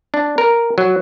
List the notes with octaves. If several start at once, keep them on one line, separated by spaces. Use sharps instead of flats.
D4
A#4
F#3